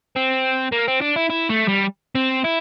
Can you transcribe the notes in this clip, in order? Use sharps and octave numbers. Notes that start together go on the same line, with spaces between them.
C4
A#3
C4
D4
E4
E4
A3
G3
C4
E4